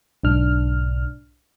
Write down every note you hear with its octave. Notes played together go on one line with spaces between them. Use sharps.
B1 G#2 D4 F6